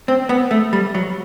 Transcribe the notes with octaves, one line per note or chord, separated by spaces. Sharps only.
C4
B3
A3
G3
F#3